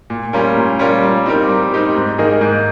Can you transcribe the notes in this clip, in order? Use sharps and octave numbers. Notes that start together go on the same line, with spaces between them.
A#2
G3 C#4 F4 A#4
A#2
G3 C#4 F4 A#4
G3
C4 D#4 G4 A#4
G3
C4 D#4 G4 A#4
G#2
D#3 A#3 D#4 G#4
G#2